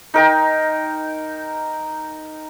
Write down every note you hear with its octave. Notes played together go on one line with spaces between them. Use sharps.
D#4 A#4 G5